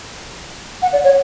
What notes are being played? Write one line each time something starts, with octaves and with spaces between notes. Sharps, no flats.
F#5
D5
C#5